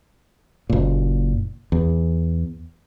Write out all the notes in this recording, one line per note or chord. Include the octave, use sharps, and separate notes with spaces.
F#1 A#2
E2